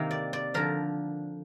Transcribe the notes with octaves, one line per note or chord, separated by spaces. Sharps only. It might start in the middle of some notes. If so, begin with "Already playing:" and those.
Already playing: C3 D#3 A#3 C4
D5
D5
D3 F3 A#4